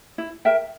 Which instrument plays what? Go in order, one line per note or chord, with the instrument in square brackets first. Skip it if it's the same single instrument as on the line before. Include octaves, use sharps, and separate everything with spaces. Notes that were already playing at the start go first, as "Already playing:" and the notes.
[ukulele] E4
A#4 E5 G5